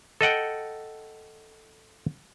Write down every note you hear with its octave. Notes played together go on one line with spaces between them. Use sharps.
A4 D#5 F#5 G5